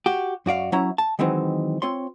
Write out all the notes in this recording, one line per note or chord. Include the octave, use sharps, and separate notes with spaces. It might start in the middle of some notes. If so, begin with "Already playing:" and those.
F#4 G4
F#2 F#4 D5 F5
F#3 C#4 E4 A#5
A5
D#3 E3 F#3 G#3 C4 D#4
C4 F4 C#5 C6